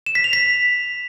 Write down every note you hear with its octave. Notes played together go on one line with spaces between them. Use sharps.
E7
B6
F7
B6